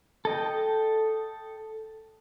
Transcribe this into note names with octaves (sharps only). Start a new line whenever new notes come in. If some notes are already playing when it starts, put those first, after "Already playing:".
A4 D#5 G5